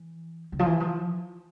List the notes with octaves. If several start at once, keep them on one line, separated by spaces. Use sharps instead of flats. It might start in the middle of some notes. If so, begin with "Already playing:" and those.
Already playing: E3
C#3
F3
E3
F3